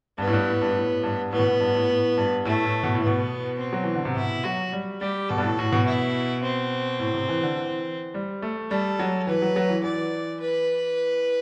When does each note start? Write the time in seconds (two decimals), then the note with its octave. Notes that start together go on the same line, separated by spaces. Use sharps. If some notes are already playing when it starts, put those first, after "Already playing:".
0.18 G2 B3
0.27 A2
0.33 G2
0.47 A2
0.61 G2
0.76 A2
1.03 G2
1.32 A2 B3
1.39 B2
1.46 A2
1.60 G2
1.75 A2
1.89 A2
2.17 G2
2.45 A2 A3
2.65 A2
2.83 B2
2.95 A2
3.03 B2 B3
3.60 C4
3.73 F#3
3.84 E3
3.95 D3
4.05 C3
4.16 B2 E4
4.44 F#3 F#4
4.72 G3
5.01 G3 G4
5.29 B2 A4
5.38 G2
5.44 A2
5.58 A2 F#4
5.72 B2
5.86 E4
6.43 C4
7.00 A2
7.14 C3
7.29 E3
7.43 D3
7.57 E3
8.14 G3
8.42 A3
8.70 G3 A4
8.99 F#3
9.27 E3 B4
9.42 F#3
9.56 F#3
9.69 E3
9.84 E3 D5
10.41 B4